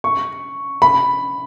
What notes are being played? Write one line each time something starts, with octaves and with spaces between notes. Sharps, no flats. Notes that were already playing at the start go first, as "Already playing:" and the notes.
C#6
B5